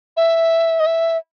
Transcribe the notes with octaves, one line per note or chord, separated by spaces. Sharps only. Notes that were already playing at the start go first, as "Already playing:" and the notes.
E5
D#5
E5